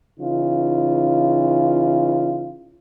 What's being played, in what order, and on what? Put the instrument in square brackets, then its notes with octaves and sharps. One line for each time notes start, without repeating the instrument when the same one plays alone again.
[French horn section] C#3 E3 D#4 F4